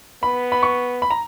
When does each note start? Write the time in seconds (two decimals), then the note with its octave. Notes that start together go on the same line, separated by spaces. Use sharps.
0.23 B3 B5
0.52 B5
0.63 C#6
1.02 B5
1.10 A#5